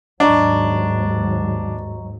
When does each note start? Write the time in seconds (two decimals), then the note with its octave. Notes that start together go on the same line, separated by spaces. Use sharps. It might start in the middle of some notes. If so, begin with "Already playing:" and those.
0.20 D#2 G#2 F#3 D4 D#5 A#5 C#6